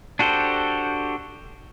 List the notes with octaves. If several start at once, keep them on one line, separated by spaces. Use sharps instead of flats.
D4 F#4 G4 A4 C5